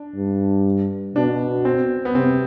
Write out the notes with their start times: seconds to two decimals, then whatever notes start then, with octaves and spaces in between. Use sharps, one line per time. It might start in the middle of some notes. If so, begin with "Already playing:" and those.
Already playing: D4
0.16 G2
1.15 B2 D4
1.65 C4
2.05 B3
2.15 C3 C4